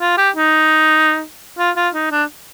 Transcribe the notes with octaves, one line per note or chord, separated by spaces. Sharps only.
F4
G4
D#4
F4
F4
D#4
D4